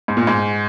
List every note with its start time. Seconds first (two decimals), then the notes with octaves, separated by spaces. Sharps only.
0.08 G#2
0.17 A#2
0.27 G#2